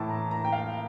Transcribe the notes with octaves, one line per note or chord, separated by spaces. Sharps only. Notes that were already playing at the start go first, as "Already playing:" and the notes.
Already playing: A2 E3 A5
A#5
A#5
G5
F5